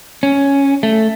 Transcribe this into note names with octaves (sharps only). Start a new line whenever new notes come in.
C#4
A3